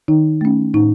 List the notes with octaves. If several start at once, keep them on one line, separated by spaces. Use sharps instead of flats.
D#3 D#4
A3 C#4
A2 D#4